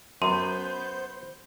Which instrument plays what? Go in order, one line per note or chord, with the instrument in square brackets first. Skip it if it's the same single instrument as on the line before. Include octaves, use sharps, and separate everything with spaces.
[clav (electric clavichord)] F#2 [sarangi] B3 [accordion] C5 G6 [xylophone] A#5 C6